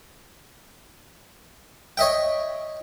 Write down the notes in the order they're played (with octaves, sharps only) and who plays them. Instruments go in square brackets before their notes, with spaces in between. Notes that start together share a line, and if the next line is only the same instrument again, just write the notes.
[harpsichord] C#5 D#5 E5 G5